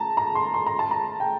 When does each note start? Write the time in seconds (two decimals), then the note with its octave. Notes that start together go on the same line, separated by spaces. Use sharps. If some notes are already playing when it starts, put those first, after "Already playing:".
Already playing: A5 A#5
0.17 A#5
0.35 C6
0.54 C6
0.66 A#5
0.79 A5
0.91 A#5
1.20 G5